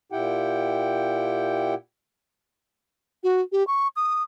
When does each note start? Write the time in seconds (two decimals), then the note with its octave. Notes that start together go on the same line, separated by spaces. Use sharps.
0.12 A#2 E4 G4 F#5 G5
3.23 F#4
3.52 G4
3.67 C#6
3.96 D#6